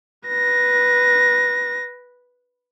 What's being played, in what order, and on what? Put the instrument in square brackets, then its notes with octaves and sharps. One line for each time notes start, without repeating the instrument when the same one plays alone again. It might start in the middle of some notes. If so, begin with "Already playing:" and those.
[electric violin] B4 A#6